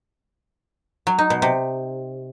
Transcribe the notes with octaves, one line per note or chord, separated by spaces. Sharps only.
F#3
D#4
B2
C3